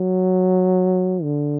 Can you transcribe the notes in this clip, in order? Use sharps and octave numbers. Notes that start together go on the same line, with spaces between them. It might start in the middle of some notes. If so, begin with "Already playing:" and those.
Already playing: F#3
D3